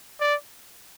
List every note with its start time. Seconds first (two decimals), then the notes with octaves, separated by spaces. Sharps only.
0.20 D5